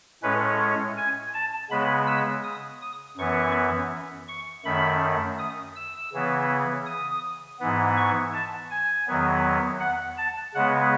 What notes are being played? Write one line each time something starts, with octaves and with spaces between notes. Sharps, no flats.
A2 G#3 C#4 B4
G#5
A5
C#3 G#3 B3 B5
E6
D#6
D#6
F#2 E3 B3 C#6
C#6
F#2 D#3 A3 B5
D#6
E6
C#3 E3 B3
D#6
G#2 E3 B3
C#6
A5
G#5
E2 D#3 F#3 B3
F#5
A5
C#3 G#3 B3 F#5